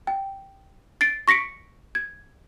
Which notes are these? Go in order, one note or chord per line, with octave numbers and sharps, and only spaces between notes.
G5
A6 C7 D7
C#6 A#6 B6 C#7 D7
G#6